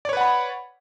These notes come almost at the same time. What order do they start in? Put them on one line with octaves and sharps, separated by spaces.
D5 C#5 B4 F#5 B5